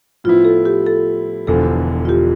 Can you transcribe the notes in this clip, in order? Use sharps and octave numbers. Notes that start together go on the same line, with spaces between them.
A2 F3 B3 E4 F4
A4
G4
A4
E1 E2 D3 F3 A4
F4
G4